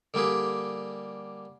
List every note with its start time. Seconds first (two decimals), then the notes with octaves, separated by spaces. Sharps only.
0.14 D3 G3 A#3 G4 G#4